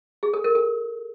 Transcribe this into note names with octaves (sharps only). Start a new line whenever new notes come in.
G#4
A4
A#4
A4